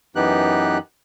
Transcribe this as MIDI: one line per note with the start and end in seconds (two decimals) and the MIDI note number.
0.16 0.78 42
0.16 0.78 52
0.16 0.78 59
0.16 0.78 63
0.16 0.78 67
0.16 0.78 90